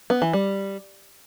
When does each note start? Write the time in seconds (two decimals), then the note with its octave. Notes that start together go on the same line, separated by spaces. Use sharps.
0.10 B3
0.22 E3
0.33 G3